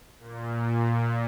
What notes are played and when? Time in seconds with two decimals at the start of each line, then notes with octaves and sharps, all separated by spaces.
0.19 A#2
0.49 A#2